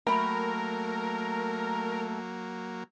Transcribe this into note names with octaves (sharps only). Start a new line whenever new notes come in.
F#3 A3 A#3 A#4 G5 B5